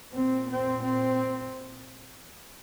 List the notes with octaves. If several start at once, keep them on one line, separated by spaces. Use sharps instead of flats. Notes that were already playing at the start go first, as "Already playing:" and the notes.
A#2 C4
C4
C4